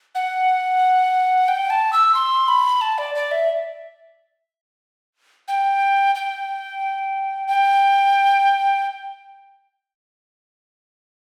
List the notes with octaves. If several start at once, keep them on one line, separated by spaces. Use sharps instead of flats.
F#5
G5
A5
E6
C6
B5
A5
D5
D5
E5
G5
G5
G5